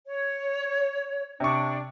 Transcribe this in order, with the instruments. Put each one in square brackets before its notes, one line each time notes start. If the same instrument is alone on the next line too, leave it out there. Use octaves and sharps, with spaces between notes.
[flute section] C#5
[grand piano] C3 C#6 [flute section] D4